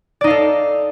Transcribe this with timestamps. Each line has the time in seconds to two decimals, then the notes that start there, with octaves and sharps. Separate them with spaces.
0.21 D5
0.24 D#4
0.27 F5
0.30 A4